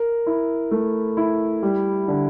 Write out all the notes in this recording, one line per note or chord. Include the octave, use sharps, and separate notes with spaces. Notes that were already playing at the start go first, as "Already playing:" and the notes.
Already playing: A#4
E4
A3
E4
G3
D3